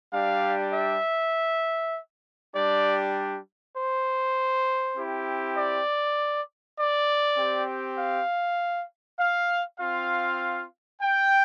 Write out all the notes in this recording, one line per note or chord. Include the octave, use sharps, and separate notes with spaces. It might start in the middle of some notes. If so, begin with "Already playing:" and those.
G3 D4 G4 F5
E5
G3 D4 G4 D5
C5
C4 E4 G4
D5
D5
C4 G4
F5
F5
C4 F4 F5
G5